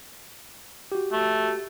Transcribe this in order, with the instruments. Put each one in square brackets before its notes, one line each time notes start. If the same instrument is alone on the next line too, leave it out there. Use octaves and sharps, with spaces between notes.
[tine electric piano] F#4 G4
[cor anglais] A3